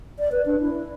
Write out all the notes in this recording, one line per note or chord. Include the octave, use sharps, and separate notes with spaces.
D5
B4
D4
E4